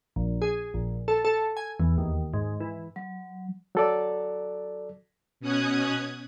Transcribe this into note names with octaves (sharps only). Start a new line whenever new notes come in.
A#1
G#4
A#1
A4
A4
G#5
E2
D#2
G#2
E3
F#3
F#3 A4 D5
B2 C#4 D#6 F#6 G#6